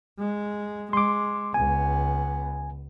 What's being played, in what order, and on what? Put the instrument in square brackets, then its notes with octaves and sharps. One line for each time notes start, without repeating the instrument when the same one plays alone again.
[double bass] G#3
[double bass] G#3 [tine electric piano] C6 D6
[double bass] C#2 B3 [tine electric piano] G#5